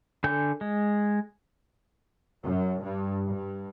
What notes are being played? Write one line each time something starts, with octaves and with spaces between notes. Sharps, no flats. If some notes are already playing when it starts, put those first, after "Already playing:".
D3 A4 G#5 G6
G#3
F#2
G2
G2